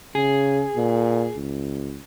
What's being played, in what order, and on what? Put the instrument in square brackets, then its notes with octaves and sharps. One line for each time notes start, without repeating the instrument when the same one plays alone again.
[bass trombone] C#3 [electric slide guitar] G#4
[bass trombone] A#2
C#2